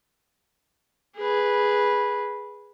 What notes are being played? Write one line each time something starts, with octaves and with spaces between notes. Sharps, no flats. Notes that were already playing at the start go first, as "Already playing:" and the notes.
G#4 B4